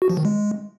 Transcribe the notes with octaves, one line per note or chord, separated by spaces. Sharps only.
F#4
F3
D#3
G#3